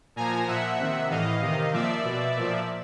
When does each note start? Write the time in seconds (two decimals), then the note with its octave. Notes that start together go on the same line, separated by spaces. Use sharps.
0.16 A#2 F3 G#5 A#5
0.47 A#2 F3 E5 F#5
0.80 C3 D#3
1.10 A2 E3 D#5 F5
1.41 C3 D#3
1.73 A#2 F3 D5 E5
2.05 B2
2.36 A#2 F3